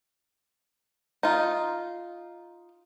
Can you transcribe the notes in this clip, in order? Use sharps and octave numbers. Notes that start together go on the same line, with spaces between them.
D#4 F4